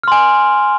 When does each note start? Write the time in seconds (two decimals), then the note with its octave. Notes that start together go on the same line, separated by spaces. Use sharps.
0.03 F6
0.08 C6
0.12 G#5